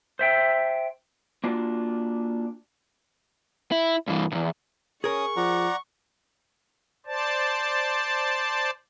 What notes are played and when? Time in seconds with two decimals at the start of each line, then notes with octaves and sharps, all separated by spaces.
0.19 C5 E5 G5
1.44 A#3 D4 F4 F#4
3.72 E4
4.08 G2 E3
4.32 B1 E2
5.04 C#4 G#4 A#4 C#6 D#6
5.37 F3 D5 F#5 A#5
7.06 C5 D5 A5